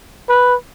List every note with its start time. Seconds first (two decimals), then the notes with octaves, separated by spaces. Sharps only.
0.29 B4